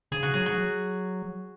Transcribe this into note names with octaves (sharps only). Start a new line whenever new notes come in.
C#3 G#4
F#4
F#3 G#4
F#4
F#3